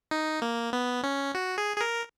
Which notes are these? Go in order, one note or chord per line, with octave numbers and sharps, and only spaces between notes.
D#4
A#3
B3
C#4
F#4
G#4
G#4
A#4